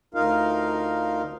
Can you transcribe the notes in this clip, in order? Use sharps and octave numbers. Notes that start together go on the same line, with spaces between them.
D2 D#4 F4 A#4 F5